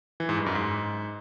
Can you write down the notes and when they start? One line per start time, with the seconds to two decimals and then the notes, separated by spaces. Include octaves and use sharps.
0.20 E3
0.29 G#2
0.38 G2
0.46 F#2
0.55 G#2